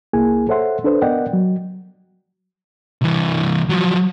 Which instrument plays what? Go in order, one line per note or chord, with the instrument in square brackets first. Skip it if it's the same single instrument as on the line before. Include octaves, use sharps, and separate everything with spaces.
[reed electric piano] C2 A#3 E4 G#4 G#5
A4 C5 C#5 E5 F#5 C6
D4 A4 B4 C5
B3 A#4 D5 D#5 F#5 G5
F#3
[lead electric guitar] C2 E3
F3 F#3